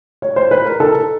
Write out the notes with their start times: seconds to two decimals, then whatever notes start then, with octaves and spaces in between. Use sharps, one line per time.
0.22 C#5
0.36 C5
0.51 B4
0.66 A#4
0.80 A4